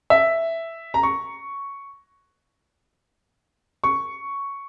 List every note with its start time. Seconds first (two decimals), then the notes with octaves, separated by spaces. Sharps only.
0.10 E5
0.94 A#5
1.03 C#6
3.84 C#6